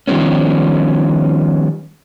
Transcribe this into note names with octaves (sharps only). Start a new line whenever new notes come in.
D#3 F3 G3 B3 C#4